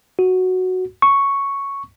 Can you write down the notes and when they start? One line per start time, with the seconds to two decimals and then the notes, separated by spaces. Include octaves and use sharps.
0.19 F#4
1.02 C#6